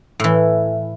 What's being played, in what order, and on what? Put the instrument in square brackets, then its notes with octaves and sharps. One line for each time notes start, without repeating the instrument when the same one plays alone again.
[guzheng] A2 E3